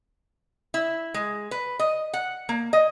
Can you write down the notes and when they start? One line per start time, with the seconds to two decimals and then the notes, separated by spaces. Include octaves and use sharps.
0.74 E4
1.14 G#3
1.51 B4
1.79 D#5
2.13 F#5
2.49 A#3
2.73 D#5